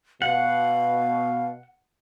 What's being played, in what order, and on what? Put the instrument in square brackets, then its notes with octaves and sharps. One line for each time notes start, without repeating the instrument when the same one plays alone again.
[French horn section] B2 [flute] F5 [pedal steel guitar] F#5